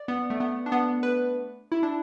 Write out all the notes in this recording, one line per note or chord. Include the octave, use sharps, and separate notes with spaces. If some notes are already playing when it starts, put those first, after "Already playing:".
Already playing: D5
B3
A3
B3
D4
B3
B4
E4
D4